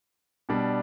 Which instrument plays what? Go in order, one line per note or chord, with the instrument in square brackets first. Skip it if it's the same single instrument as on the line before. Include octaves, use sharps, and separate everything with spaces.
[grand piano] B2 G3 D4